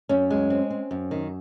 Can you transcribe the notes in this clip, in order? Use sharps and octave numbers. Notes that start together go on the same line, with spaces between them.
F#2 C#4
G#3
C4
C4
F#2
D#3